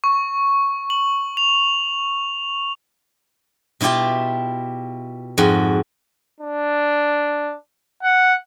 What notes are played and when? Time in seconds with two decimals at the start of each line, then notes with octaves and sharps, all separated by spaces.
0.04 C#6
0.90 F#7
1.37 F7
3.81 B2 E4 F4 G4 A5
5.38 F2 G#2 F#4
6.40 D4
8.03 F#5